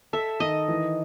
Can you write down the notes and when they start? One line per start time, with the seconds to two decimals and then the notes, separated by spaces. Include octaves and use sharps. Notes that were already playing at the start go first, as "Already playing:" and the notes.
0.13 A4 E5
0.40 D#3 D#5
0.68 E3